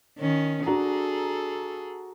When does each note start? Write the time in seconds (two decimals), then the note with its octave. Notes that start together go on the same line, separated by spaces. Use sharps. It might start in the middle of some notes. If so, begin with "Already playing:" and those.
0.19 D#3 C#4
0.66 D4 F#4 G#4 A4 A#5